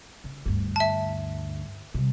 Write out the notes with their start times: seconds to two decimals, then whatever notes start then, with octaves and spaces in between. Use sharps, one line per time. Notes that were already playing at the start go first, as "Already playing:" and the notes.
0.24 C#3
0.46 D2 G2
0.76 E5 A5
1.94 C3 G3